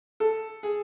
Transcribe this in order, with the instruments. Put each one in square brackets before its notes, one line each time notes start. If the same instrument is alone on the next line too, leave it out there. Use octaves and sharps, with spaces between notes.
[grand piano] A4
G#4